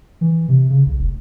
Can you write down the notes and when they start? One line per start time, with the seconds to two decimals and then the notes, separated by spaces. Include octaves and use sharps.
0.21 E3
0.49 C3
0.70 C#3
0.86 B1
1.00 F1